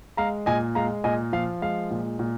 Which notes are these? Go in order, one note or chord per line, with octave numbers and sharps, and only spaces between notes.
G#3 F5 A#5
A#2 D#5 G#5
G#3 F5 A#5
A#2 D#5 G#5
F3 F5
G#3 F5
A#2
A#2